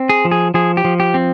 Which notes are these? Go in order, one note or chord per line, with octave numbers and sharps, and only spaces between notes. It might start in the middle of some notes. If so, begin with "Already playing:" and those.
Already playing: C4
G#4
F3
G#4
F3 G#4
G4
F3
G4
C4